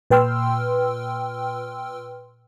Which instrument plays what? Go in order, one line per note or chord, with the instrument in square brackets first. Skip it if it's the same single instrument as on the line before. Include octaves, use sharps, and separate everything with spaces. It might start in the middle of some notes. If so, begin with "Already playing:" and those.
[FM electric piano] A#2 B4 G5 C6 E6 F6